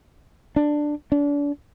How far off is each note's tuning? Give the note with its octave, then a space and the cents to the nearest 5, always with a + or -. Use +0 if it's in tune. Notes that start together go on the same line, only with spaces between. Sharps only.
D4 +10
D4 -35